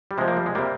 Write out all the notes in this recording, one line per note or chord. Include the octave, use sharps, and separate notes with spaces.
G3
C3 F3 G#3
A#3
G3
G#3
C3 G3 A#3